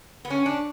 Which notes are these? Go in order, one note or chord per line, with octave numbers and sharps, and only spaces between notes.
B3
C#4
D4